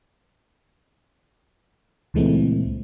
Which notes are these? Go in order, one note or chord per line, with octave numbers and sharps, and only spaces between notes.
C#2 A#2 E3 G#3 A3 C4